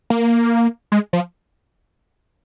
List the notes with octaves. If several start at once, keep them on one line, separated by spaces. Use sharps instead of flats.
A#3
G#3
F3